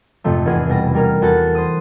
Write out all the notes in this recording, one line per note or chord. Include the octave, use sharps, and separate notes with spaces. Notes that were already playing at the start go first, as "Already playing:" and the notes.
F2 G#2 C3 F3 A3
F1 E2 G#4
B2 G3 A#6
G3 G#4 A#4 F6
E2 F#4 A4 F#6 A6
C5 D#6